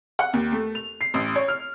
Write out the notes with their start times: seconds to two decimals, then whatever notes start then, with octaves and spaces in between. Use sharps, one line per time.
0.19 F#5
0.33 D#2
0.52 A3
0.75 F7
1.01 C7
1.14 A1
1.36 C#5
1.48 F6